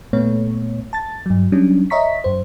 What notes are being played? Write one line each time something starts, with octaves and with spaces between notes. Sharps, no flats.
A#2 A3 B3 C#5
A5 A6
G2 F#3
F#3 G3 C#4 D4
C#5 D#5 E5 A#5 C#6 B6
F#2 C5